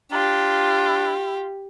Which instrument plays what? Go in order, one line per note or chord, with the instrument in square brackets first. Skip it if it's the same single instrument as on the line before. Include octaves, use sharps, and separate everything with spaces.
[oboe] D4 [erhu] F4 [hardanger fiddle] G4